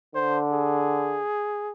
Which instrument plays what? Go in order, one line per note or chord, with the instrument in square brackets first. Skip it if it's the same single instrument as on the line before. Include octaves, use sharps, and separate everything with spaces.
[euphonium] D3 [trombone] C5
[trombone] G#4